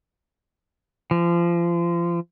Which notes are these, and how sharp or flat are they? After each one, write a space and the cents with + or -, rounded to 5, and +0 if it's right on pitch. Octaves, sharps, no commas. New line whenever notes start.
F3 -30